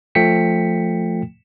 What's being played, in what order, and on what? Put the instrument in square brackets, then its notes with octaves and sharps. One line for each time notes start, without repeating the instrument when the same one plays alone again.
[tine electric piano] F3 A3 G5 B6 C#7